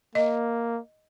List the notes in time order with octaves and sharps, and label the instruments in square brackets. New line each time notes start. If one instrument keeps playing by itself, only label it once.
[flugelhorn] A#3 [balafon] D#5